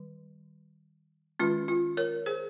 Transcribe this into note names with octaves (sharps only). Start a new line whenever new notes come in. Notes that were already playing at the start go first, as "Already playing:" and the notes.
Already playing: D#3 G3
D#3 G#3 C#4 F4
F4
A#4 C#5
G#4 C5